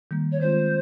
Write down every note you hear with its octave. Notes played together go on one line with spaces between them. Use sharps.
D#3 G3 A#3
C#5
D#3 G#3 C4 F4 C5